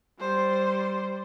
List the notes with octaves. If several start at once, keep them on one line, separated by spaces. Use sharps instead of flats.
G3 C5